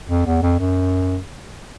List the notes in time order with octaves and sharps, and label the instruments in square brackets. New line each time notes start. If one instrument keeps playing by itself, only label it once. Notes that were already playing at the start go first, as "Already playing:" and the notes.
[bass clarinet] F2
E2
F2
F#2